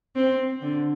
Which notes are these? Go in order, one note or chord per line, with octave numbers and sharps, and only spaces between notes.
C4
D3